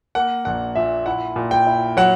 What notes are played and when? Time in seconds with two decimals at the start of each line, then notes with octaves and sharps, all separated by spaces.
0.15 A#3 F#5
0.45 A#1 F#5
0.75 A#2 E5
1.06 E4 F#5
1.36 A#2
1.51 G5
1.67 E4
1.97 F#3 F#5